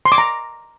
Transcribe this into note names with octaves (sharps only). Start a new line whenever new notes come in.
C6
D6
A#5